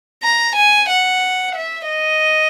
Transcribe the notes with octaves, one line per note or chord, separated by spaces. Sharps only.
A#5
G#5
F#5
E5
D#5